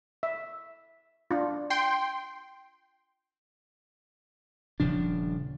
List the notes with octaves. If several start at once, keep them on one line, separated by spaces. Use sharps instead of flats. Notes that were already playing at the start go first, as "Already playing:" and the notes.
E5
D4 F4
G5 C6
D#1 C#3 F3 D4